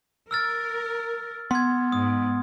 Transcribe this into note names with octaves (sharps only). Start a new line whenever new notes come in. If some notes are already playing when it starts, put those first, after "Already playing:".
A#4 E6 F6 A6
B3 C6 G#6
G#2 D#6